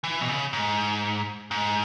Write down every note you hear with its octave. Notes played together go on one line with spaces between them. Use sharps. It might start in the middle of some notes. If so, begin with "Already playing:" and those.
E3
B2
C#3
G#2
G#2